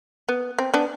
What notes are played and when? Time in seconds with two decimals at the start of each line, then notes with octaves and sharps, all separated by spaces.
0.29 B3
0.59 C4
0.74 B3 D4